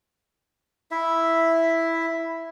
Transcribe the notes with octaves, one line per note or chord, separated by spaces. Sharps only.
E4 E5